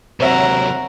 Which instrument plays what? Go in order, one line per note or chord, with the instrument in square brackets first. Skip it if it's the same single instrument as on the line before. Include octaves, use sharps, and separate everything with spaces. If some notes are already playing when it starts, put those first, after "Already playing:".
[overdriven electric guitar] C3 F#3 [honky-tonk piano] C4 C#5 E5 [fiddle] A#4 F#5